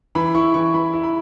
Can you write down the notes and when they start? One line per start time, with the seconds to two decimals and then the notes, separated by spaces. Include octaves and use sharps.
0.15 E3 B5
0.35 E4 C#6
0.54 E3 C#6
0.74 E3 B5
0.93 E4
1.03 B5